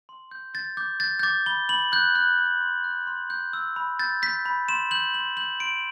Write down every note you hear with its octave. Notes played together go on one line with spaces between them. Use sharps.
C6
G6
G6 A6
D6 G6
G6 A6
G6
D6 A6
B5 G7
B5 F#7
F#6 G6
F#6
F#6
C6
F#6
C6
G6
E6
B5
G6 A6
G6 B6
B5
C6 E7
G6 F#7
C6 F#7
G6 F#7
C6 D7